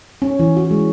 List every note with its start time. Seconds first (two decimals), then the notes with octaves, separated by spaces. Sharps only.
0.22 C#4
0.39 E3
0.57 F#4
0.71 G#3